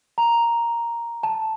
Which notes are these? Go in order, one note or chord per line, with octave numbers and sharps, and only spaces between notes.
A#5
A5